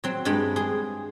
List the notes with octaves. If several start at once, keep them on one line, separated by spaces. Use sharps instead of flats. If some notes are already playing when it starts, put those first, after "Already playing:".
F#3 C4
G2 G#3 G5 B5
G#4 C6